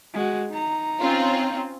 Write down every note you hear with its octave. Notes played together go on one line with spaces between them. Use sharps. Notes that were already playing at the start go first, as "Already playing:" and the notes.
G#3 F#4
D#4 A#5
C4 C#4 F4